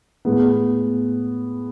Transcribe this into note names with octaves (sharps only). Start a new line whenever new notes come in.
A2 G#3 B3